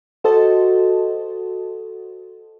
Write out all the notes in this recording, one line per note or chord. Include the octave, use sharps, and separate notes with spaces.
F#4 A4 C5 D#5 A5